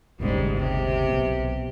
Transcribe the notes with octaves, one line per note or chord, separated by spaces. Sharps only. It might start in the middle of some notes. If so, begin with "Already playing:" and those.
D#1 G#1 G#2 C#3 G3
C3 G4
B1 B3